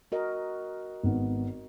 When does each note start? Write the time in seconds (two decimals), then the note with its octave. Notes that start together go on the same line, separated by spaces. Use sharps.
0.12 F#4 A#4 D#5
1.03 G#1 B3